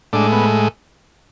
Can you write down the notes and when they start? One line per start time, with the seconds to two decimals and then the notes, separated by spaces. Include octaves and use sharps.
0.13 A2 G#3 D4
0.32 B3